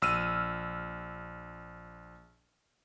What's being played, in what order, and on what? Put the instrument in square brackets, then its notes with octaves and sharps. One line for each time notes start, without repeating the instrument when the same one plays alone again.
[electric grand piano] A#1 E6 F6 D#7